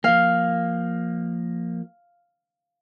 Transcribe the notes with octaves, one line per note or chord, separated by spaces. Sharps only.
F3 A#3 F5